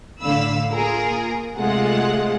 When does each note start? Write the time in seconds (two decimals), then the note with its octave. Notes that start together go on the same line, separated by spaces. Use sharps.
0.22 A2 D3 F5 B5 E6
0.72 A#3 F4 G#4 A#4
1.58 C3 G#3 A3 F4 F#5